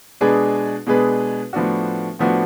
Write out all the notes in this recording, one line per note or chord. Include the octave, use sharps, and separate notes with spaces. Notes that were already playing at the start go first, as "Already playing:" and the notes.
B2 G#3 D4 G#4 B4
B2 G#3 D4 G#4 B4
A2 F3 B3 D4 F#4
A2 F3 B3 D4 F#4